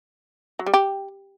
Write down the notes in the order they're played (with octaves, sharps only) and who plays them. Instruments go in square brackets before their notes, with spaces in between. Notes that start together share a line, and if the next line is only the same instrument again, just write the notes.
[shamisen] F#3
G3
G4